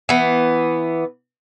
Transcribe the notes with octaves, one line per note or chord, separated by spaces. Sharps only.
E3 B3